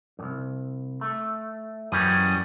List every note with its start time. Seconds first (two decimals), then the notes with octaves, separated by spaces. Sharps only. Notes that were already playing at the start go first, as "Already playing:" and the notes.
0.19 C2 F#2
1.01 A3
1.92 F#2 E3 G3 C#4 D#6